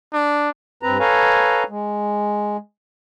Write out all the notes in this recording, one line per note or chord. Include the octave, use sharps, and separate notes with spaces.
D4
G2 C4 B4 A#5
A4 B4 C#5 F5 G#5 A#5
G#3